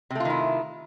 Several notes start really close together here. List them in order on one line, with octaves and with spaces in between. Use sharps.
C3 A3 F4 D#3 E4